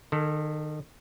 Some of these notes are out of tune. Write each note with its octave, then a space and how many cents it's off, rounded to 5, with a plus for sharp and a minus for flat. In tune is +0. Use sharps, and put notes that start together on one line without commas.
D#3 -30 A4 +0